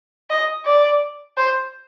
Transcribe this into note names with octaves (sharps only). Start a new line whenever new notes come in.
D#5
D5
C5